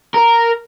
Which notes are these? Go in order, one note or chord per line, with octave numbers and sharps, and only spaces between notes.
A#4